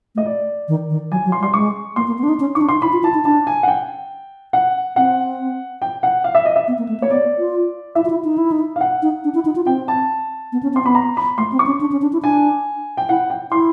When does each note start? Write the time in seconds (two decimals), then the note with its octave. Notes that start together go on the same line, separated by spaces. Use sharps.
0.15 A3 D#5
0.26 D5
0.68 D#3
0.90 D#3
1.11 F#3 G#5
1.25 F#3
1.32 C6
1.40 G3
1.43 C6
1.54 G#3 C#6
1.96 A#3 C6
2.07 A#3
2.18 B3
2.23 D4
2.29 D#4
2.40 C#4
2.55 D#4 C#6
2.61 D4
2.69 D#4 C6
2.82 E4 B5
2.93 F4
3.03 E4 A5
3.14 D#4
3.25 D4 A5
3.47 G#5
3.63 F#5
3.68 G5
4.53 F#5
4.96 C4 F#5
5.82 G5
6.03 F#5
6.24 F5
6.35 E5
6.45 D#5
6.56 E5
6.68 B3
6.78 A#3
6.89 A3
7.00 A#3 C#5
7.10 B3 D5
7.38 F4
7.95 E4 E5
8.05 F4
8.10 E4
8.24 D#4
8.38 E4
8.52 D#4
8.76 F5
8.81 F#5
9.02 D#4
9.24 D4
9.34 E4
9.45 D#4
9.56 F4
9.67 C4 G5
9.88 A5
10.52 B3
10.63 C#4
10.74 C4 C6
10.84 B3 B5
10.95 A#5
11.17 B5
11.38 A3 C6
11.52 C4
11.59 C#6
11.66 C#4
11.81 D4
11.92 C#4
12.02 D4
12.13 E4
12.23 D4 G#5
12.97 G5
13.09 E4 F#5
13.30 G5
13.52 E4 C6